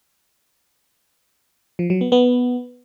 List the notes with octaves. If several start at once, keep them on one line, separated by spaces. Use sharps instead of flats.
F3
F#3
B3
B3